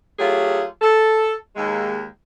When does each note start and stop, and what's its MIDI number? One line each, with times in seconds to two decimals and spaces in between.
0.18 0.63 54
0.18 0.63 57
0.18 0.63 65
0.18 0.63 67
0.18 0.63 68
0.81 1.33 69
1.56 2.05 39
1.56 2.05 56